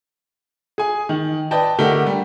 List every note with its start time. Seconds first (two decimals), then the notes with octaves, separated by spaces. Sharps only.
0.78 G#4 G#5
1.09 D#3
1.51 B4 D5 D#5 G5 A5
1.78 D3 A3 G4 A#4 F#5 G7
2.06 G3